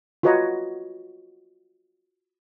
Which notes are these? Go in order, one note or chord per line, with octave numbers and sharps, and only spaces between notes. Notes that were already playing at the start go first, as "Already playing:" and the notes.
F4 F#4 B4 C#5 D#5 A#5